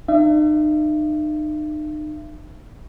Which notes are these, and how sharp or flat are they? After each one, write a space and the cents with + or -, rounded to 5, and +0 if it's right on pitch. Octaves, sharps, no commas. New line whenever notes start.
D#4 -40 E5 +40